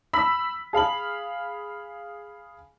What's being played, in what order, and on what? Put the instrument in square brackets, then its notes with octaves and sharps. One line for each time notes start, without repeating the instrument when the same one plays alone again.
[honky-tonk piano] B5 E6 B6
G#4 F5 B5 F#7